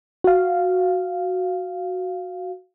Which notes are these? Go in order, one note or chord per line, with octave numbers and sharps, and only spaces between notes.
F#4 F5